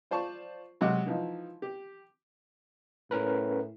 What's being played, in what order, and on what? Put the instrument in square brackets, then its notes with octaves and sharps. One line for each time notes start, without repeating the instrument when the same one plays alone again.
[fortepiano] F4 C5 D5 A5 C#6
C3 F#3 G#3 D#5 F#5 D6
E3 F3 D#4
G4
[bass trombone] A2 [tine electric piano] C#4 A#4 B4